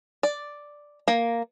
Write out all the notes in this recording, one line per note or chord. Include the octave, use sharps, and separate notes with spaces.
D5
A#3